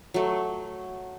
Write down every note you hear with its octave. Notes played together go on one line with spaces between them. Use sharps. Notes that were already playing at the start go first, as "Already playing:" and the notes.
F#3 A3